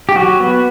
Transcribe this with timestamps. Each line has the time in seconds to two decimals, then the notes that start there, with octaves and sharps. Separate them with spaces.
0.09 G4
0.16 F#3 F#4
0.40 B3